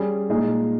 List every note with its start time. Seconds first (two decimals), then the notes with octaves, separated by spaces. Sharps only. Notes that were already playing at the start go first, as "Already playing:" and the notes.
Already playing: G3 C#4 G#4
0.29 A#2 G#3 D#4 G#4 D#5